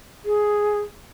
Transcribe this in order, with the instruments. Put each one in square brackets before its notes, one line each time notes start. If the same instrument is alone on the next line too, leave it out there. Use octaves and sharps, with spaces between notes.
[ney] G#4